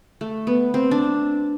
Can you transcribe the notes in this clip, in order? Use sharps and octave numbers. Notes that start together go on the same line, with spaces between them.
A3
B3
C4
D4